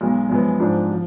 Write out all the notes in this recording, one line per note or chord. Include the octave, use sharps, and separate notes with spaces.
B1 B2 G#3
F#2 F3 G#3 B3
G#2 F3 G#3 D4
F3